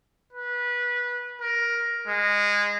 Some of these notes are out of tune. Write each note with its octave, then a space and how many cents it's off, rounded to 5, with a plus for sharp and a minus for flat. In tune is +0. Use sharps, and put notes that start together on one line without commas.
B4 -20
A#4 +10
G#3 -20